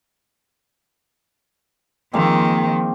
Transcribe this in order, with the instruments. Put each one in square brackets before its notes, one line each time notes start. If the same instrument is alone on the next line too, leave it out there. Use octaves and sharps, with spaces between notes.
[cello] D#3 F3 [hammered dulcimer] G#3 A#3 C4